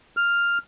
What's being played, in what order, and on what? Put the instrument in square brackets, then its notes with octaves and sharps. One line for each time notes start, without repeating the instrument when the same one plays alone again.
[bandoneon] F6